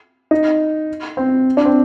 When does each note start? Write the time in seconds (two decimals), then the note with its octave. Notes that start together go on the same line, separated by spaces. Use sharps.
0.31 D#4
1.17 C4
1.57 D4
1.65 C4